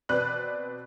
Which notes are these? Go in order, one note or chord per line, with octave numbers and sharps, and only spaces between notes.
B2 C4 B4 D5 F#6